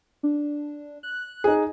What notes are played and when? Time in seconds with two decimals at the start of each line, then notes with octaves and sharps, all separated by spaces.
0.23 D4
1.03 F#6
1.44 D#4 G#4